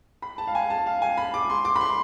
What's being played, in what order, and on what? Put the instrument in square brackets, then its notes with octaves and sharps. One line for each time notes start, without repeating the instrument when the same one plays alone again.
[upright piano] B5
A5
F5
G#5
A5
F5
G#5
B5
D6
C6
D6
B5
C6